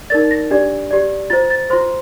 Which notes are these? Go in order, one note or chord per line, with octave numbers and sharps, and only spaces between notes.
D#4 A#4 D5 A6
A#6
D4 G4 D5
G4 D5
F4 C5 A6
A6
F4 C5 C6